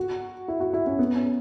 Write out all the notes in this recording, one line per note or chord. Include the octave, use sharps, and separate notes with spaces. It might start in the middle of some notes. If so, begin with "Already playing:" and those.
Already playing: F#4
E4
F#4
E4
C#4
B3
C#4